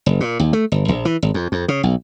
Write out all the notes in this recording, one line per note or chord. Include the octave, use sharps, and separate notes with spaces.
F#1
A#2
D#2
A3
G1
A#1
E3
G#1
F2
F2
C#3
B1